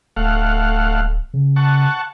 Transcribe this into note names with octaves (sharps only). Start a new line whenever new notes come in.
D1 A3 F5 F#5
C#3
F#5 A5 C#6